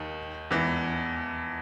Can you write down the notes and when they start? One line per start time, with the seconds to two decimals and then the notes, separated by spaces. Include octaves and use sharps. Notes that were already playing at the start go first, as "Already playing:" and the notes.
Already playing: D#2 D#3
0.51 E2 E3